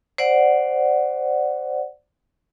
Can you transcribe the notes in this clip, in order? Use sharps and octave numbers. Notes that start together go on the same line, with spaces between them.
C5 D5 F#5